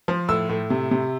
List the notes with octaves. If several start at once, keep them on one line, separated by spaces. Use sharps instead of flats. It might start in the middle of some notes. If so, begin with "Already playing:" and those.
F3
A2 E6
A2
C3
C3